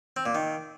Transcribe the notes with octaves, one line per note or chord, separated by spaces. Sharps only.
C4
A#2
D#3